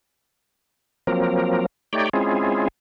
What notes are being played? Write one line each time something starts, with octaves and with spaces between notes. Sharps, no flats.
F3 F#3 A#3 C4 A#4
A3 D#4 G4 C#5 D5 G5
G#3 C4 C#4 E4 F4 G#4